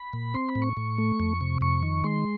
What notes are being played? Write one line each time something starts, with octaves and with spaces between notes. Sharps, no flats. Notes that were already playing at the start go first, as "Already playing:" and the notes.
Already playing: B5
A#2
C4 C6
B5
A2
C#6
A2
A3
F2
C3
F2 C#6
D#3
G#3 C6